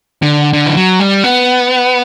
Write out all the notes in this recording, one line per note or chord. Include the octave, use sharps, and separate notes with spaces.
D3
D3
E3
F#3
G3
B3